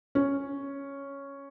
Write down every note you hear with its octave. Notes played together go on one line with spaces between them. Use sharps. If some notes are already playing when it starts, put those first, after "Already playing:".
C#4